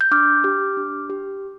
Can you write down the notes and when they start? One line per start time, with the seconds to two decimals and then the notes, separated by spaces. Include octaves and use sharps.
0.01 G6
0.11 D4 D6 F6
0.44 G4
0.77 D4
1.10 G4